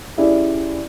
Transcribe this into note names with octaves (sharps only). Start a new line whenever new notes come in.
C#4 E4 G4 G#4 D5 E5